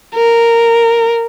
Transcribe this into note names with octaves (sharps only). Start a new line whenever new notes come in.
A#4